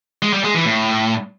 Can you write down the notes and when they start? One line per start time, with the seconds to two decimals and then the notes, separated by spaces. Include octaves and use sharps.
0.22 G#3
0.33 G3
0.44 G#3
0.55 E3
0.65 A2